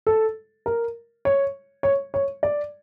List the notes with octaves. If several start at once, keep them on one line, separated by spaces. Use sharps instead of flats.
A4
A#4
C#5
C#5
C#5
D5